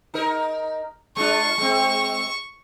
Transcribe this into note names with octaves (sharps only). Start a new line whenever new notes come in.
D#4 A#4
G#3 D4 F4 C#6
G#3 C4